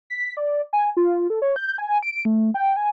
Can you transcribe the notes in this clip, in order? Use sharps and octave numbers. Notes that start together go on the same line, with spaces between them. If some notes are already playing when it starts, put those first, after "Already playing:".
B6
D5
G#5
F4
A4
C#5
G6
G#5
D7
A3
G5
G#5